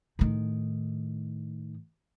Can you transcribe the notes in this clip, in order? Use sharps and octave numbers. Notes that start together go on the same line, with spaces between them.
A2 D#3